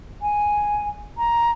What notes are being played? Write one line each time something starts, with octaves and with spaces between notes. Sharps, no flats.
G#5
A#5